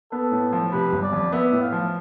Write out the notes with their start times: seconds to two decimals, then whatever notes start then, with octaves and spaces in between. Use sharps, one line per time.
0.12 B3 A4
0.31 A2
0.52 F3
0.71 C3 B4
0.92 G1
1.03 D5
1.13 F2
1.32 B3 E5
1.52 A2
1.62 F5
1.72 F3